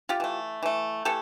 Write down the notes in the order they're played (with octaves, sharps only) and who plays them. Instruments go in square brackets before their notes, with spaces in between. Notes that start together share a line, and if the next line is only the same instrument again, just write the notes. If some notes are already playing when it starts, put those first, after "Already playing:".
[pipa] F4 G4
E3 A3
E3 A3
E3 A3 G4 A4